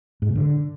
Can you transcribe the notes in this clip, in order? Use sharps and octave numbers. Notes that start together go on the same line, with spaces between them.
G#2
C3
D3